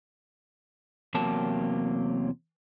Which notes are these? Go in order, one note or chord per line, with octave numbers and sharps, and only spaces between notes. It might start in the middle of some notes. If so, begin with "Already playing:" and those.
E2 C3 F#3 A#3 G4 A5